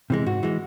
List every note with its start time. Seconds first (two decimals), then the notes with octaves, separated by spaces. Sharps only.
0.10 C3 E3 G#3
0.26 G#2 F#4
0.43 E3 G#3